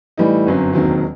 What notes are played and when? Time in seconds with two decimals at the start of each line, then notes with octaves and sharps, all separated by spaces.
0.17 A2 E3 G3 D#4
0.46 G1 F#2 F#3 C4
0.73 E1 D#2 D#3 F#3 C4